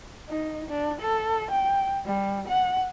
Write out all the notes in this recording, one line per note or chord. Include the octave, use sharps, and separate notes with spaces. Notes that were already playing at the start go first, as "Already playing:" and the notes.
D#4
D4
A4
G5
G3
F#5